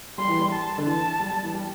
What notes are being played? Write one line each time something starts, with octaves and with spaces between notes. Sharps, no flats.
G3 C6
E3
G3
A5
D3
E3 A5
G3
G3
E3
G3